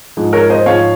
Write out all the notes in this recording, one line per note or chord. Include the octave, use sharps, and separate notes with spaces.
G#2 F3 G#3
A#4 C#5
C5 D#5
G#2 F3 G#3 C#5 F5